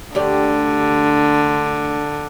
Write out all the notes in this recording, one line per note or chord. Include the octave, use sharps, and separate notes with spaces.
D2 D3 G4 D5